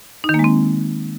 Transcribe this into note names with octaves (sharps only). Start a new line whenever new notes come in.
D#4
D#3
A#3
G#3
C4